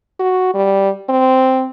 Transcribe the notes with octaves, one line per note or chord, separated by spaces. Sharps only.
F#4
G3
C4